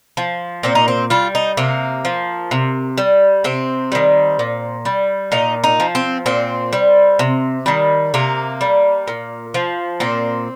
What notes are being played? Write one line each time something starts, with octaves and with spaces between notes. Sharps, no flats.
F3
A#2 C4
D#4
C4
G3 F4
D#4
C3 A#3
F3
C3
G3
C3 C4
D#3 G3
A#2
G3
A#2 D#4
D#4
F3
C4
A#2 C4
G3
C3
D#3 G3
C3 A#3
G3
A#2
F3
A#2 C4